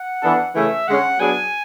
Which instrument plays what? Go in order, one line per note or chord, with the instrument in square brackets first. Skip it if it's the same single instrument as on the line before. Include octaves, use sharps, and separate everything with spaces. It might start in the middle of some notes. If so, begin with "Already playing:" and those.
Already playing: [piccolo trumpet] F#5
[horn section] E3 B3 D4 A4
[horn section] C#3 E3 A3 C#4 G#4 [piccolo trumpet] E5
[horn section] D3 G#3 C#4 [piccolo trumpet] F#5
[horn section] F#3 B3 D4 G#4 [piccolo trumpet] G#5